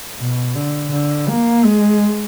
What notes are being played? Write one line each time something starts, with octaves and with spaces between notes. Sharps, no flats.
B2
D3
D3
A#3
G#3